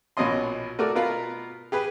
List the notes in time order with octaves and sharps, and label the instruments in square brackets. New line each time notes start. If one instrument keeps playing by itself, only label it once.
[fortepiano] A#1 B2 C#4 D#5 C6
A3 F#4 A#4 D5
B2 B3 F4 A#4 F5 B5
G4 G#4 B4